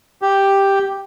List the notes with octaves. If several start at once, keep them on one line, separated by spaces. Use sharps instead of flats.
G4